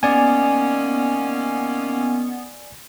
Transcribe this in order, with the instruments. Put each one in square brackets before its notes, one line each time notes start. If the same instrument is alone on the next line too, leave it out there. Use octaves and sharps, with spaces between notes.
[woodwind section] D#3 A#3 C#4 [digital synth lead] B3 [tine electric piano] D5 G#5